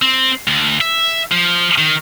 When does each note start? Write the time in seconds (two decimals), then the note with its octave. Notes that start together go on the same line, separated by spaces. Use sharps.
0.02 C4
0.48 D2
0.81 E5
1.32 F3
1.78 D#3